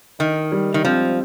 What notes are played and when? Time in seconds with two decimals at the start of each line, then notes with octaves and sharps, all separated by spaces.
0.19 D#3 D#4
0.52 G3
0.74 D#3
0.85 F3 C4